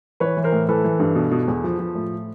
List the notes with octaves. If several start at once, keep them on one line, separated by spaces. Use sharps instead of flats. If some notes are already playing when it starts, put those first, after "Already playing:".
E3 B4 C#5
E3
A#4 C5
A2
E3 A4 B4
E3
G2
B2
B2
E2
F3
F3
A2